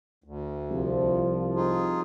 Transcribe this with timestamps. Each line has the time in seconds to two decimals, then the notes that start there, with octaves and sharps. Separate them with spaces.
0.24 D2
0.71 C2 F3
1.55 D#4 F4 G#4